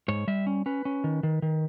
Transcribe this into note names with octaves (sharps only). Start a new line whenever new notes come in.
G#2 C#5
G3 E5
C#4
C#4 B4
C#4
D#3
D#3
D#3